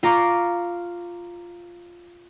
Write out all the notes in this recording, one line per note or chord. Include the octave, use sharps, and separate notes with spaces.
F4 F5 A#5 C#6 D6